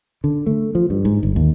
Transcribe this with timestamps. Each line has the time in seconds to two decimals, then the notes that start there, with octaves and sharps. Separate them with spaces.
0.24 D3
0.46 A3
0.75 F3
0.90 G2
1.05 G#2
1.23 G1
1.36 D#2